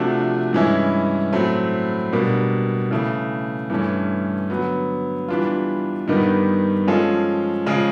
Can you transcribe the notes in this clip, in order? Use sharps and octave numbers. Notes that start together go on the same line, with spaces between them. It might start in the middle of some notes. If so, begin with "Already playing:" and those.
Already playing: C3 F3 A3 D4 F#4
G2 E3 G#3 C#4 E4
A2 F#3 A3 C4
B2 G3 A#3 D4
C#3 E3 A3
G2 E3 A3 C#4
D3 F#3 B3
E3 G3 B3 D4 F4
G2 D#3 G3 B3 D#4
F3 G#3 C#4 F4 A4
C#3 F3 G#3 C#4